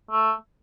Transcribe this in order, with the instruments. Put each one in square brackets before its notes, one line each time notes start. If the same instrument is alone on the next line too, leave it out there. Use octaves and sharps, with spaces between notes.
[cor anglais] A3